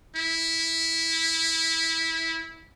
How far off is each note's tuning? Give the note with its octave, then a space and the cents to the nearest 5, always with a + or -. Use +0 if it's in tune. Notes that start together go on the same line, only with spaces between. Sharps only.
E4 -10